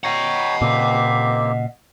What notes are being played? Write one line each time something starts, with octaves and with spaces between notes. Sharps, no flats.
C#5 D#5 F#5 G5 A#5
A#2 C#3 A#3 C4 G4